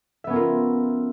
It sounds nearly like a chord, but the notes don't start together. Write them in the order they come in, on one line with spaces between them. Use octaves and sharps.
E5 B3 C#4 A#4 F4